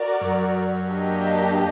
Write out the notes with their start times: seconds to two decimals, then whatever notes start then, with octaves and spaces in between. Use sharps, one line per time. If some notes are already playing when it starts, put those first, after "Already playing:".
Already playing: F#4 A#4 D5
0.21 F#2
0.86 A#3 D4 G4 A#4 D#5